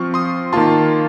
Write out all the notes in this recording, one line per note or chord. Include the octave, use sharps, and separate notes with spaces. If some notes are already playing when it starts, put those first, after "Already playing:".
Already playing: F3 C4 F4 C#6 F6
C6 D#6
D#3 A#3 F4 A5 C6